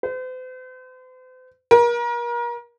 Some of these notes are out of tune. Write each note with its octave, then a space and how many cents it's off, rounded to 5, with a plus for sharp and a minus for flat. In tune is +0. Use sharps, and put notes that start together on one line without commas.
C5 -45
A#4 +35